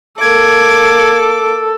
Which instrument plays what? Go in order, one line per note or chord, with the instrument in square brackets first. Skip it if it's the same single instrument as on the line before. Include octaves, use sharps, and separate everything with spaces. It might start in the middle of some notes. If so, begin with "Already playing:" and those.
[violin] A#3 [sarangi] A4 [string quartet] D6 [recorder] G#6